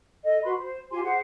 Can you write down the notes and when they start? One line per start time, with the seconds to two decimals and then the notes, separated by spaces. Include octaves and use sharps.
0.23 A4 D#5
0.43 F#4 B4 B5 C6
0.58 C5
0.91 F4 G4 G#5 C6
1.03 G#4 C5 F#5